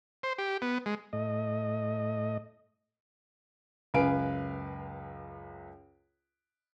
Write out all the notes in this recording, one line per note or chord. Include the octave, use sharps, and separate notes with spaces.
C5
G4
B3
G#3
A2 D#5
C#2 F#2 B4 F5 G#5 D7